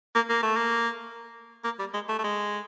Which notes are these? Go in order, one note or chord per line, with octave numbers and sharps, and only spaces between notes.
A#3
A#3
A3
A#3
A#3
G3
G#3
A3
A3
G#3